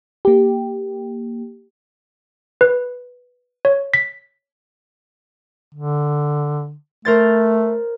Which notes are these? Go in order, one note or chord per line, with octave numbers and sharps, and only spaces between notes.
A#3 G4
B4
C#5
B6
D3
A3 A#4 C5 A6